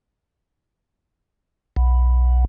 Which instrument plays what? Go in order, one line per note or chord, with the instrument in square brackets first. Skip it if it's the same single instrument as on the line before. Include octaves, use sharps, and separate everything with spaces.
[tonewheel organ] B1